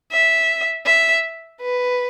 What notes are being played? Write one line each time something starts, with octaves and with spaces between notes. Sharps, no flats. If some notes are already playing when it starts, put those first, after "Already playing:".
E5
E5
B4